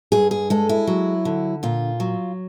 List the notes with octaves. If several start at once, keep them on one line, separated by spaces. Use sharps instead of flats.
G2 G#4
G#4
G#3 A4
E4
F#3
D3
A#2 F4
F#3